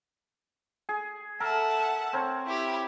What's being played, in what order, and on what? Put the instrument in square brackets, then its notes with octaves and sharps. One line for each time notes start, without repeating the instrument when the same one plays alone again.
[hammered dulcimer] G#4
[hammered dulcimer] A4 A#4 [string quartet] E5 F#5 A5
[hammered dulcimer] C4 A#4 C#5
[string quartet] E4 G4